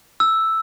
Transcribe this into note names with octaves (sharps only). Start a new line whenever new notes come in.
E6